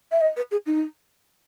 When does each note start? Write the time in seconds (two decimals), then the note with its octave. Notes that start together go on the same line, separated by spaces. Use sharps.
0.12 E5
0.21 D#5
0.36 B4
0.51 G#4
0.66 D#4